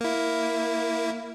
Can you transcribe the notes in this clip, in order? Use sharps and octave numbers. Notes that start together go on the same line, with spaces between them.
A#3 E4